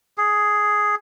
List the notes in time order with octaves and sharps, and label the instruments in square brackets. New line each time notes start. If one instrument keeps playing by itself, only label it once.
[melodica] G#4